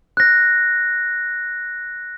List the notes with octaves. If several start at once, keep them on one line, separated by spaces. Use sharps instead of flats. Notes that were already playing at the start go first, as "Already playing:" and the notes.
F#6 A#6